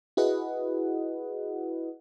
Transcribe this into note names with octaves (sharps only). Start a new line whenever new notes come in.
E4 F#4 G#4 B4 D#5 F#5